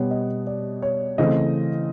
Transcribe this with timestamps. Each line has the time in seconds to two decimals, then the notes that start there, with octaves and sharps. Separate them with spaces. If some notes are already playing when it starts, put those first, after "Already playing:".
Already playing: B2 G3 B3 C#5
0.11 D#5
0.47 D5
0.82 C#5
1.18 C#3 E3 A3 C4 D#5